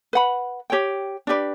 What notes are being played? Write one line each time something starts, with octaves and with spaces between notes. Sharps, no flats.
B4 F#5 B5
G4 C#5 G5
D4 G4 B4 D5